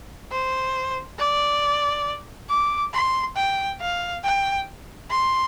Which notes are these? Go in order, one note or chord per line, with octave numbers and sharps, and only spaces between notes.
C5
D5
D6
C6
G5
F5
G5
C6